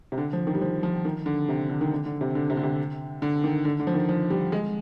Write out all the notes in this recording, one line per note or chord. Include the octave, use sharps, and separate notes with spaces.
C3
D3
F3
D#3
G3
F3
F3
D#3
D3
C3
D3
D#3
D3
D3
C3
D3
C3
D3
C3
D3
D#3
D3
D3
F3
D#3
F3
G3
G#3